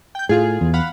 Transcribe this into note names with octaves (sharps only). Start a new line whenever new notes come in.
G5 G6
A2 F4 G#4
E2
F5 F#5 B5